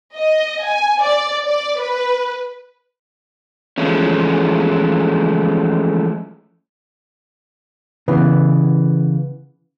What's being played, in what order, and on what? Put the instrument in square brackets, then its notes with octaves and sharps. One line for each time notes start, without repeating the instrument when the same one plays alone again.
[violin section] D#5
G#5
D5
D5
B4
[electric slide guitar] E3 F3 G#3 A3 C#4
[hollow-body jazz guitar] C#3 E3 B3